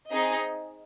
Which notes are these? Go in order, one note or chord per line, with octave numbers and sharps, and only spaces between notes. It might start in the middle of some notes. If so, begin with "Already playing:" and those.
C4 D#4 G#4 D#5